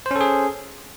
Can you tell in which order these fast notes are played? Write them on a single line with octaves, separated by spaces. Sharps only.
C5 C#4 A4 G#4